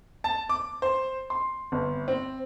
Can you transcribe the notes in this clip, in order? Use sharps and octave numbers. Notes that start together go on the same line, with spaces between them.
A5
D6
C5
C6
G1
C4